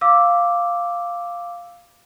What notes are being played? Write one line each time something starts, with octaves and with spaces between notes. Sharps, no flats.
F5 D6 E6